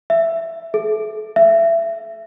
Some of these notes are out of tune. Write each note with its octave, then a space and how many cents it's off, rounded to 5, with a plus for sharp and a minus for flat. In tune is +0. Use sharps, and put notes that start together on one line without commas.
E5 +10
A4 -45
E5 +20